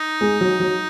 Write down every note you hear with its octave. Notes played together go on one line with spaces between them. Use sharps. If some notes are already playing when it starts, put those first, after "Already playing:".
Already playing: D#4
G#3
F#3
F#3